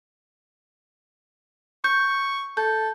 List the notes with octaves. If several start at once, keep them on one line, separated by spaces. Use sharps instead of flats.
C#6 G6
A4 G6